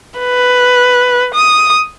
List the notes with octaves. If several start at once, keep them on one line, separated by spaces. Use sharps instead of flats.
B4
D#6